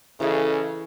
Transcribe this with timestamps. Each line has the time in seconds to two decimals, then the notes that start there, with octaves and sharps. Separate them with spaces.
0.20 C#3 E3 G#4 A4 C#5 D#5